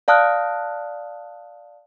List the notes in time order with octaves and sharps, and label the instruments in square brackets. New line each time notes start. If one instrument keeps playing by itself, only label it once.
[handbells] D5 F5 A5 D#6 F6 F#6